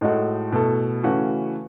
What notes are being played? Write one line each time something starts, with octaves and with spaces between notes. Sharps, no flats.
A2 G#3 D#4 F#4 A4
B2 A3 E4 A4
C#3 E3 A3 C#4 F#4